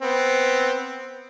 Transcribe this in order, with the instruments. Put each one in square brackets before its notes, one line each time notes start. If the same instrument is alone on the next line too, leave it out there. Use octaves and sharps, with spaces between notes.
[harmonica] B3 C4